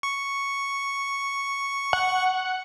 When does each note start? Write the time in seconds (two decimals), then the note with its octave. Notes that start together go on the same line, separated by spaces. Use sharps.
0.03 C#6
1.93 F#5